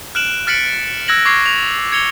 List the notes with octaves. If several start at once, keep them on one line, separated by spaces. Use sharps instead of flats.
F6 F#6 D7 E7 F#7
F6 A6 B6 C#7 D7 F#7
E6 F#6 G#6 A#6 F#7
C#6 D6 G#6 C7
F7
G#6 C#7 F7 G7